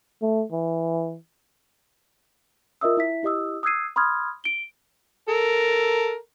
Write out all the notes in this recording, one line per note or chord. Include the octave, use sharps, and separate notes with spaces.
A3
E3
F4 A#4 D#5 E5 D#6 E6
E4 E5 B6
E4 G4 D#5 D#6 E6
D#6 E6 F#6 G#6 C7 D#7
B5 C6 D#6 F6 G#6
D7 G7
A4 A#4